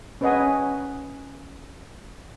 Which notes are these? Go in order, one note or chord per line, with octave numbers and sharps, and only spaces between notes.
C#4 B4 C#5 D#5 F#5 G#5